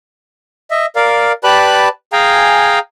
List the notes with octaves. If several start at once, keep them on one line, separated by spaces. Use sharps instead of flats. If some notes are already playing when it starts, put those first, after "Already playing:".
D#5 E5
A#4 D5 F5
G4 B4 D5 A5 B5 F#6
G#4 F5 G5 G#5 A#5